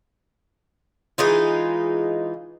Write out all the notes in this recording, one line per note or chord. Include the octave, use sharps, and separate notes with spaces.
E3 G#3 D#4 F4